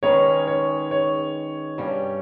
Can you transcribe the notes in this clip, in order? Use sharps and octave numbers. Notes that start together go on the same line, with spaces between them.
D#3 G#3 C#4 G#4 B4 C#5
C#5
C#5
G2 G3 C#4